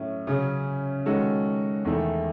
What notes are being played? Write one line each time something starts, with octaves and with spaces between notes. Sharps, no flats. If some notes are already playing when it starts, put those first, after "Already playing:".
Already playing: A2 F#3 C#4 E4
C#3 F#3 C#4 G#4
D#3 G#3 C#4 F#4 A4
E2 D#3 A3 E4 A4